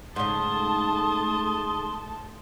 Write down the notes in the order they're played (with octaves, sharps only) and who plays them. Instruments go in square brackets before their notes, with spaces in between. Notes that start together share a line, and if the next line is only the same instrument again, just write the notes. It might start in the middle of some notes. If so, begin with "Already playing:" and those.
[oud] G#2 C#3 [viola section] A3 A5 [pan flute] C6 [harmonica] D#6